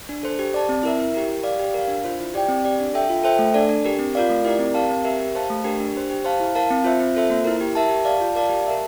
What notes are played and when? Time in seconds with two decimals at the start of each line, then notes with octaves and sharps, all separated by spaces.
0.09 D4
0.23 A4 C5
0.39 G4
0.54 D5 A5
0.69 C4
0.83 E4 A#4 E5
0.99 E4
1.14 G4 A#4
1.29 G4
1.44 D5 F5
1.59 G4
1.74 A#4 F5
1.88 D4
2.04 F4 C5
2.19 E4
2.34 G4 D5 G5
2.48 C4
2.65 G4 D5
2.80 D4
2.94 A4 E5 G5
3.09 F4
3.24 A4 C5 E5 G5
3.39 A3
3.54 D4 A4 D5
3.69 D4
3.85 G4 A#4
3.99 C4
4.15 F4 A#4 D5 F5
4.30 A3
4.45 E4 G4 A#4 D5
4.59 C4
4.74 G4 A#4 F5 A5
4.89 C4
5.05 G4 A#4 E5
5.20 G4
5.35 C5 F5 A5
5.50 A3
5.64 D4 G4 A#4
5.80 D4
5.94 G4 C5
6.10 G4
6.25 C5 F5 A5
6.40 E4
6.55 A#4 F5 A5
6.70 C4
6.84 F4 C5 E5
7.00 C4
7.15 F4 A4 C5 E5
7.30 A#3
7.44 E4 A#4
7.61 G4
7.75 A#4 E5 A5
7.89 G4
8.05 D5 F5 A5
8.21 F4
8.35 A#4 D5 F5 A5
8.50 G4
8.65 A#4 E5 A5